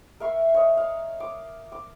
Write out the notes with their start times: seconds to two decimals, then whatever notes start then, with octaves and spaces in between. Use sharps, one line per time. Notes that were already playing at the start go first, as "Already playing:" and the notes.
0.20 A#4 E5 F5 C#6
0.54 C#5 D#5
0.77 F5
1.20 D6
1.72 D6